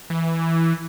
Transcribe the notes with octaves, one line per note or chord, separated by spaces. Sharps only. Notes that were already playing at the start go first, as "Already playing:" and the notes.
E3